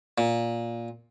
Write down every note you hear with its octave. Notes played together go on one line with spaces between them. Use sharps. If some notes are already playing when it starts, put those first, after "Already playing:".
A#2